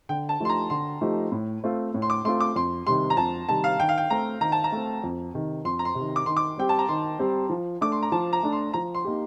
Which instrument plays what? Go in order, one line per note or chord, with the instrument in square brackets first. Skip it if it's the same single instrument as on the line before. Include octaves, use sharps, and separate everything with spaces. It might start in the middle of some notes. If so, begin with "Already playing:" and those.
[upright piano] D3 [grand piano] G5
[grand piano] A5
[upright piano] F3 A3 D#4 G4 [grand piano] C6
[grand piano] A#5
[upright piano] D3 [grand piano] C6
[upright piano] F3 A3 D#4 G4
A2
A3 C4 F4
A2
[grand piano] C6
D6
[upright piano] A3 C4 F4 [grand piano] C6
[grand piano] D6
[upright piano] F2 [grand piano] C6
[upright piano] C3 D#3 G3 [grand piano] C6
[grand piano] A#5
[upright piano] F2 [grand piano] A5
[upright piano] C3 D#3 G3 [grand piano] A5
[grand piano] F5
[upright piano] D#3 [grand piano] G5
[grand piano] F5
G5
[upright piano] A3 C4 [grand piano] A#5
[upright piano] D#3 [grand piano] A#5
[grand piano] A5
A#5
[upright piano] A3 C4
F2
C3 D#3
[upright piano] F2 [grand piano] C6
[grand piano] A#5
C6
[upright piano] C3
D#3
[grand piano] D6
[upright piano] D#3 [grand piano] C6
[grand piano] D6
[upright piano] G3 C4 G4 [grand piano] G5
[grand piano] A5
A#5
[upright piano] D#3 [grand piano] C6
[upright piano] G3 C4 G4
F3
[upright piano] A3 D4 [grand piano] D6
[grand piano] C6
A#5
[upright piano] F3 [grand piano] A5
[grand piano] A#5
[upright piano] A3 D4
[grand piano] C6
[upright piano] F3 [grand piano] A#5
[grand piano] C6
[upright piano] A#3 D#4 G4